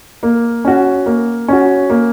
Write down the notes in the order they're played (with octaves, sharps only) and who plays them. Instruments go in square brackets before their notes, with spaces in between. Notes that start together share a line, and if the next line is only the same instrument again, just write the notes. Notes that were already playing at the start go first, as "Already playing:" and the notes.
[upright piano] A#3
C#4 F#4
A#3
C#4 F#4
A#3